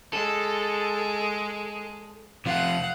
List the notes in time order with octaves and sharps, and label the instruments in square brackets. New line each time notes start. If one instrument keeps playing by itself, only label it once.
[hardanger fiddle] G#3 [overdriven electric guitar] A4
[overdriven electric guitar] C3 F3 [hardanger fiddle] F5 F#5